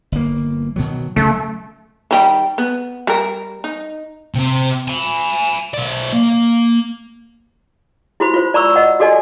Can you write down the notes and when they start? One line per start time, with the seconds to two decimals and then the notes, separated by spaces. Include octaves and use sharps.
0.12 G1 A#3
0.76 B2 D#3 F#3
1.16 C#3 F#3 G#3 A3
2.11 D#3 G3 G5
2.58 B3
3.07 G3 A#4
3.64 D#4
4.35 C3 C4
4.88 G#5 B5
5.74 B1 D5
6.13 A#3
8.20 E4 F#4 G4 C5 B5
8.34 F4 C5
8.54 D5 A#5 B5 C#6 E6
8.76 D#5 F#5
9.00 F#4 G4 A4 D5 D#5 G#5